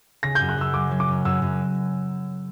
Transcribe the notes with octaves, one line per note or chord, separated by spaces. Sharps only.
C#3 A#6
G6
F#2
F#6
F#2 E6
F#3 D6
F#3
D6
F#2
F#2 E6
F#2